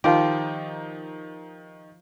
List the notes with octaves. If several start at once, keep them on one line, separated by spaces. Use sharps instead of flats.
D#3 F3 D#4 F4 G4